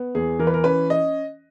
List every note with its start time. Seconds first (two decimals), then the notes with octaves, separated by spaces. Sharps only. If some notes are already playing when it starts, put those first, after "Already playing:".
Already playing: B3
0.15 E2 G#4
0.39 E3 A#4
0.47 B4
0.54 A#4
0.64 C#4 B4
0.90 D#5